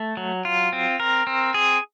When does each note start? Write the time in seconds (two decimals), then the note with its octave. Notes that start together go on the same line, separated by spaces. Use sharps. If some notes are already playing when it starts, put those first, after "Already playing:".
Already playing: A3
0.17 F#3
0.45 F4
0.73 C4
1.00 A#4
1.27 C4
1.54 G#4